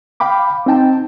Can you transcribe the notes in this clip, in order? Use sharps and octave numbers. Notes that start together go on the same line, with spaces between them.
F5 G5 B5 D6
C4 D#4 G5 A5